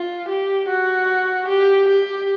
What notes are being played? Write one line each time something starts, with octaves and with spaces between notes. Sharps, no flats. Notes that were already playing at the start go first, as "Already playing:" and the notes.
Already playing: F4
G4
F#4
G4
G4